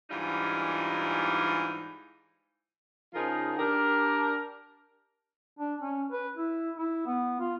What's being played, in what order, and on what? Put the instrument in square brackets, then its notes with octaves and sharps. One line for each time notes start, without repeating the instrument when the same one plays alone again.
[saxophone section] G#2 E3 G3 D4 D#4 F4
C#3 F3 D#4 F4 G#4 A#4
D4 G4 A#4
[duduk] D4
C#4
B4
E4
E4
B3
F4